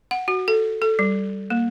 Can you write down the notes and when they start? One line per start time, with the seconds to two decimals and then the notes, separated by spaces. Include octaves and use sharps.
0.11 F#5
0.28 F#4
0.48 A4
0.82 A4
0.99 G3
1.50 A#3